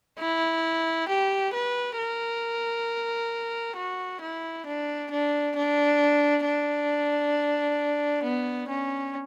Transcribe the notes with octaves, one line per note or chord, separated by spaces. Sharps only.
E4
G4
B4
A#4
F#4
E4
D4
D4
D4
D4
B3
C#4